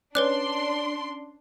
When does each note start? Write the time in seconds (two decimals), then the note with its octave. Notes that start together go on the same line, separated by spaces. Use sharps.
0.15 C#4 D4 B4 C#5 D5 C6 F#6